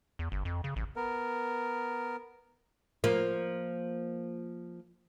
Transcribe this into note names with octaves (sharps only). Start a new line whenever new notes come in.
E2
G1
F2
C#3
A1
B3 A#4
F3 A#3